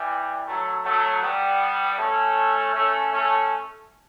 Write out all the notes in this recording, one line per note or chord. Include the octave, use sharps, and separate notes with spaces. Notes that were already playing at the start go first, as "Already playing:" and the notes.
Already playing: E3 G3
F#3 A3
F#3 A3
G3 B3
A3 C#4
A3 C#4
A3 C#4